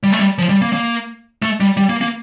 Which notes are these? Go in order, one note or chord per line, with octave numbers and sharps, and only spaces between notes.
G3
A3
G3
F3
G3
A#3
A#3
A3
G3
G3
A#3
A#3